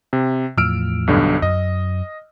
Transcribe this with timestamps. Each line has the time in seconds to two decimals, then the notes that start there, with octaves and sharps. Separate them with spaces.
0.13 C3
0.58 E2 A2 F3 E6 F6 D7
1.07 B1 G2 D3
1.42 F#2 D#5